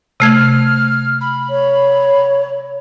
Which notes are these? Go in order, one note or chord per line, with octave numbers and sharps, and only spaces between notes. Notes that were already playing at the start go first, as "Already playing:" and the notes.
C3 A3 F6 G#6
B5
C#5